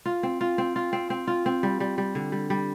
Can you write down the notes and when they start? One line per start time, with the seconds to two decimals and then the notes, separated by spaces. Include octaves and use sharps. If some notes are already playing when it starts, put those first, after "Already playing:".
0.06 F4
0.23 C4
0.41 F4
0.58 C4
0.76 F4
0.93 C4
1.10 C4
1.27 F4
1.46 C4
1.63 G3
1.80 G3
1.98 G3
2.15 D3
2.32 G3
2.50 G3